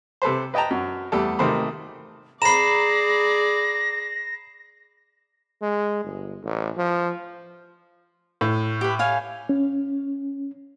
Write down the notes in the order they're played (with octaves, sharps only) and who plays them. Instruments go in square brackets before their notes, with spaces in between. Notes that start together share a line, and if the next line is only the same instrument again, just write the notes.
[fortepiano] C3 A4 B4 C5
B4 D#5 G5 A5 A#5
F#2
E2 G3 A3 A4
G#1 C3 D#3 A3 C5 B5
[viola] G#4 D5 [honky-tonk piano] A#5 B5 [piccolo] A#6 [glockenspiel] C7 E7
[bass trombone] G#3
G1
A1
F3
[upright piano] A2
[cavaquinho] G4 B4
C#5 F5 G#5
[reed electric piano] C#4